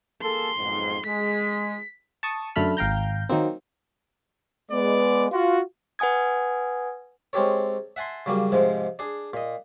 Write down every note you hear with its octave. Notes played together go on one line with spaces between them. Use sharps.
A#3 G#4 A4 C6
B1 F2 G#2
G#3 B6
A5 C#6 D#6
F#2 D3 A3 A5 B5 F6
G#1 F5 G5 A#5 G6
D#3 F#3 A#3 C4
G#3 B3 B4 D5
F4 F#4
B4 F#5 G#5 D#6 G#6
G#3 C4 C#4 G4 A4 C#5
E5 F#5 G#5 A5 C6
C#3 F#3 G3 A#3
G#2 C3 F3 G#3
D4 G#4
A#2 D#5